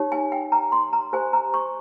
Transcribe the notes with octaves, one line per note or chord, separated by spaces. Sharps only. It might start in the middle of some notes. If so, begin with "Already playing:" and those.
Already playing: D#4 G4 C#5
G#5
G5
A#5
C6
A#5
G4 C5 G#5
A#5
C#6